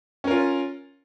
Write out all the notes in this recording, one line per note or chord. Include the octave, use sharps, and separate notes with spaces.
C#4 F4 A#4